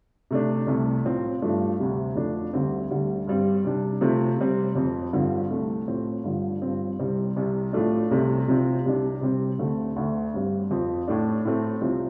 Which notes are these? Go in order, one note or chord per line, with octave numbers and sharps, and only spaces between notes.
C3 A3 D4
C2 C3 A3
A2 F3 C4
G2 F3 A3 D4
D2 C3 G3
F2 F3 A3 D4
D2 D3 G3 C4
D2 D3 G3
G2 G3 C4
C3 G3 D4
C3 F3 A3 C4
C3 G3 C4
F2 F3 C4
G2 D3 F3 C4
C2 C3 A3
A2 F3 A3 C4
G2 D3 F3
G2 F3 C4
C2 C3 G3 C4
C2 C3 G3
A2 F3 A3 D4
C2 C3 A3 C4
C3 F3 C4
C2 C3 G3 D4
C3 G3 C4
D2 D3 A3 C4
D2 D3 A3
G2 G3 C4
F2 F3 C4
A2 A3 D4
A2 A3 C4
C2 C3 F3 C4